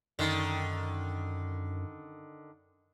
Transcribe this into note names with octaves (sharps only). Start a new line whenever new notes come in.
F#2 D3 D#3